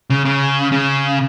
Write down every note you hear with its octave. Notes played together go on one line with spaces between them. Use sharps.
C#3
C#3
C#3